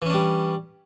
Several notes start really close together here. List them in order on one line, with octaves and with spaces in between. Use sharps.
E3 C#4 D4 G3